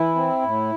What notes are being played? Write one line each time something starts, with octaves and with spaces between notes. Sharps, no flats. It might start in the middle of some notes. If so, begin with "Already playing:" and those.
Already playing: E3 E4
C4
A2